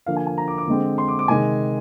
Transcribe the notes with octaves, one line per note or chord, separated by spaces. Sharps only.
D3 F3 A#3 F5
G#5
G#5
A#5
D6
D6
D3 G#3 C4
C6
D6
D6
C3 D#3 G#3 G#5